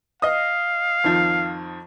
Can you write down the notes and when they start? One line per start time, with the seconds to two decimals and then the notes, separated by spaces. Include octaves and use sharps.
0.22 D#5 F5 D#6
1.04 F2 D#3 F3